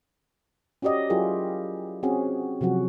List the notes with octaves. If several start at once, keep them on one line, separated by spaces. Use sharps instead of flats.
C#4 F#4 G4 D5 D#5
F#3 E4 F4 G4 G#4 A#4
C4 C#4 F#4 G#4
C3 F3 F#3 F#4